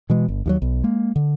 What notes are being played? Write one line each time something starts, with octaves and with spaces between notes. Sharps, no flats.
B2 E3 G#3
G1
D#2 F3 F#3
B1
G#3 A#3
D3